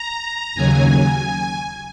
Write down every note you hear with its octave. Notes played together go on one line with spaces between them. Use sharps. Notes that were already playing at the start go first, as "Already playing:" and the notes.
Already playing: A#5
D#2 C#3 F#3 G#5